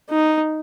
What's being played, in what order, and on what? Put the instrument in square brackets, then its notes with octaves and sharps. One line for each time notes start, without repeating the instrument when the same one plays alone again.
[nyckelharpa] D#4